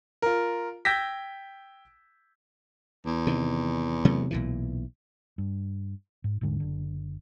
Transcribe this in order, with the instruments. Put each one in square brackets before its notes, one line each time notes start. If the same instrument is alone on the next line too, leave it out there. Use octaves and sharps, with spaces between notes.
[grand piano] F4 A#4
G5 E6 G6 G#6 A#6 B6
[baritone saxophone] E2
[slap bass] C3 D#3
C3 F#3 A3
B1 A#2 E3
[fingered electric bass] G2
G#2
D#1 G#2 D3 G#3
F#1 D3